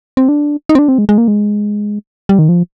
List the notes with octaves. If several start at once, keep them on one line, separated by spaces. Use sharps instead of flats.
C4
D4
D#4
C4
D4
C4
G#3
G#3
A#3
G#3
G3
D#3
F3